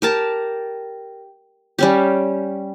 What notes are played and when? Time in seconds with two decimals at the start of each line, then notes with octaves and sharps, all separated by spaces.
0.02 G4 A#4 A5
1.79 G3 C#4 G4